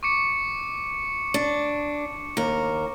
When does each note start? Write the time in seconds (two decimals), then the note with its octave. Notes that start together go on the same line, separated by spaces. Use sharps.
0.03 C#6 D6 C#7
1.34 D4
2.37 D#2 A#4